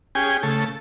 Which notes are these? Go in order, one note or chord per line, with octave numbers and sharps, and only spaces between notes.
C#4 G4 G#4 G5 G#5
C#3 A3 A4